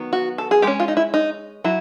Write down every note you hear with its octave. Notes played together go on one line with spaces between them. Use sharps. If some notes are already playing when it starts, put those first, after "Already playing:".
Already playing: D#3 F#3 B3
F#4
A4
G#4
G#3 C#4 G4
F4
D#4
E4
D#4
F#3 E4